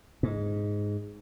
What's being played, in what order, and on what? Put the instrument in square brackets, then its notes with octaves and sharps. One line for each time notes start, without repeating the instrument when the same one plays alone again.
[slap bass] G#2